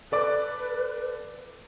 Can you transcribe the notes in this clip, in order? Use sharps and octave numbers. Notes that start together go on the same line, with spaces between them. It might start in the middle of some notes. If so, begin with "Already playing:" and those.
A4 B4 D5 D6